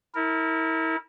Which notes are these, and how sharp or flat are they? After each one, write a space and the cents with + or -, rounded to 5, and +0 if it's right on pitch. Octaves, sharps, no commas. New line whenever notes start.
E4 -30 A#4 -20